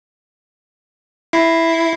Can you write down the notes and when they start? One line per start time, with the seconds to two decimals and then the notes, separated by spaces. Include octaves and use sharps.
1.33 E4 B5 A#6 C7